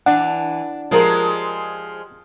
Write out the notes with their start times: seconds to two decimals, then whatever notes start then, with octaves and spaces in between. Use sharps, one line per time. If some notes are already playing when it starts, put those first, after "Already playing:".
0.06 E3 D4 F#5
0.91 F3 G#3 F4 G4 A#4